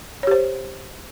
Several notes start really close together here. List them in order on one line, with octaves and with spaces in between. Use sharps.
C#5 G4 C5